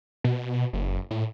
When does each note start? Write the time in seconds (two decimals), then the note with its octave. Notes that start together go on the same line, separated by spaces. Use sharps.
0.24 B2
0.73 F#1
1.11 A2